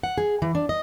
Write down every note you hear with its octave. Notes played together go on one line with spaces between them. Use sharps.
F#5
G#4
E3
D4
D#5